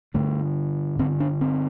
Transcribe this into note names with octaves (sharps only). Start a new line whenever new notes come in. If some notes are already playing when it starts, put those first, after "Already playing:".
G2 D3 A3
G2 D3 C4
D4
C4